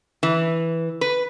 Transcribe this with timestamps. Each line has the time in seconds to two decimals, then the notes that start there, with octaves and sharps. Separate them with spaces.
0.23 E3
1.01 B4